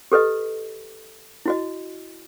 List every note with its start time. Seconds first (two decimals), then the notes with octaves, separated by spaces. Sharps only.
0.12 G4 A4 B4 D#5
1.46 E4 F#4 D#5